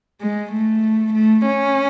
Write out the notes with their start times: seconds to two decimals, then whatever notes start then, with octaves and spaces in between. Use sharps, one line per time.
0.21 G#3
0.52 A3
1.13 A3
1.45 C#4